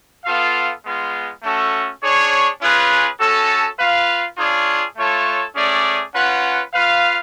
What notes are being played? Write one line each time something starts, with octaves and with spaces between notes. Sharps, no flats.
B3 F4 A4 F5
G#3 B3 F4
A3 C#4 F#4 A4
D4 G#4 C#5
C#4 F4 G#4 B4
C#4 F#4 A4
F4 B4 F5
D4 F4 G#4 C#5 F5
A3 F4 A4 C#5
A3 C#4 G#4 D5
C#4 F4 B4 F#5
F4 B4 F5